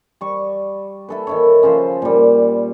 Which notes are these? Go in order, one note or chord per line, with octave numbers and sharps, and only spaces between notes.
G3 C#6
E4 A4 B4
D#3 E4 C#5
C#3 F3 C5
A#2 G3